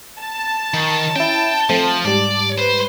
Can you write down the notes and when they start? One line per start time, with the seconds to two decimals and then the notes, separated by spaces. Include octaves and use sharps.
0.20 A5
0.74 D#3
1.16 C#4 E4 G5
1.70 F3 A3 C4
2.05 G#2 G3 D5
2.58 B4 C5